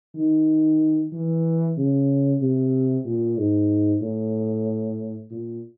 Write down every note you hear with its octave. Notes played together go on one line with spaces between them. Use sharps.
D#3
E3
C#3
C3
A#2
G#2
A2
A#2